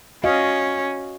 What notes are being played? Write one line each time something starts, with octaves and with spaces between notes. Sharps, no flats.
C#4 F#4 D#5 F5